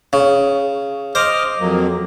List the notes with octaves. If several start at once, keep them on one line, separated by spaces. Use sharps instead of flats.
C#3
C5 D#5 D6 F6
F2 F#3 A#3